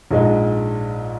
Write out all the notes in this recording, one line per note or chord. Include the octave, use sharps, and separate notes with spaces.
A#1 G#2 G#3 D#4